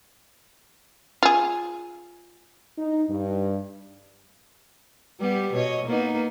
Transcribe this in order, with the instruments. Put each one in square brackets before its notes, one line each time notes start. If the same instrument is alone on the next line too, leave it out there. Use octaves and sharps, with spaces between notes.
[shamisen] F4 G#4
[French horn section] D#4
G2
[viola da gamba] G3 B3 G4
B2 C#5 D#5
A#3 B3 D#4